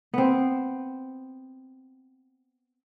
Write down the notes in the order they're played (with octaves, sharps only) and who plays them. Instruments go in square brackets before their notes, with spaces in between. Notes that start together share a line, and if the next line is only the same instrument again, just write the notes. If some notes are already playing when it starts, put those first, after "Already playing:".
[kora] B3 C4